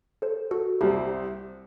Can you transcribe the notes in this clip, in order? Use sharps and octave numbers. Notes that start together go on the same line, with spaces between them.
A4 C5
F#4 A4
C2 C3 G3 C4 E4 G4